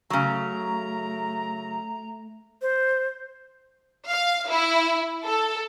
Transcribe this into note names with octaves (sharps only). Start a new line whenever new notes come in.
C#3 F#3 A3 A#5
C5
F5
E4
A4